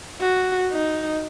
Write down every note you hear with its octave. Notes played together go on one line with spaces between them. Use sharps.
F#4
D#4